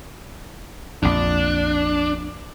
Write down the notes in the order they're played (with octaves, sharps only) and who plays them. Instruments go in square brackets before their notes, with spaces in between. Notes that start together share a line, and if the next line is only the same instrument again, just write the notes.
[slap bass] A#1 F2 [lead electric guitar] D4